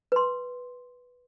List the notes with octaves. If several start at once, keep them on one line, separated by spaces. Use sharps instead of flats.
B4 C6